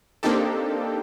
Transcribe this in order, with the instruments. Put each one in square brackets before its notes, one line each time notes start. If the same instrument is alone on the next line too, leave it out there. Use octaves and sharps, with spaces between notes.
[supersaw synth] A#3 C4 D4 D#4 G4 A4